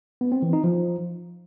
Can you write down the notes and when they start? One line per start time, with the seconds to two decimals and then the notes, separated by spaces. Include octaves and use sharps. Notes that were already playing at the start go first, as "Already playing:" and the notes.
0.21 B3
0.32 C4
0.42 E3
0.53 D#4
0.64 F3